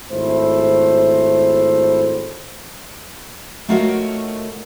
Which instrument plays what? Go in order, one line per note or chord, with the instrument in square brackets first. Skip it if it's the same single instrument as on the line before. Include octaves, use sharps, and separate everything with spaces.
[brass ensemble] G#1 A3 E4 C5
[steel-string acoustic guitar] A3 D#4 F4 F#4 A#4 C#5